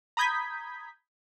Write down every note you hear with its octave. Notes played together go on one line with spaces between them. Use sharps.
A#5 B5 D#6 G6 G#6 B6